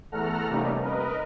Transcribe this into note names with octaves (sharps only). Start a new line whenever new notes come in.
E2 A3 A4 F#5 A#5 F6
C3 G3 A3 A#3 C#4 D#4
A#4 B4 D#5